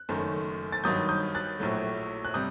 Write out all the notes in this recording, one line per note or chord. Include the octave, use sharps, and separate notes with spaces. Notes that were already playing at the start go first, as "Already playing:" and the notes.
Already playing: F#6
F#1 F#2 D#3 A3
A6
G2 D#3 F#3 D#6 G6
D#6 G6
F#6 A6
A#1 A2 F#3 A3
F#6
C3 G3 D#6 G6